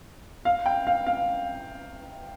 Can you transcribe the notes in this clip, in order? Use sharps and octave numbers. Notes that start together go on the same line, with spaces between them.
F5
G5
F5
F5